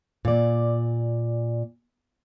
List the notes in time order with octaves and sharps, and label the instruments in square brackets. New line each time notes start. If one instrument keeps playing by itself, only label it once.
[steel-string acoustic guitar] A#2 D5